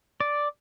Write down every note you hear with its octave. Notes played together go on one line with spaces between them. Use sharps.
D5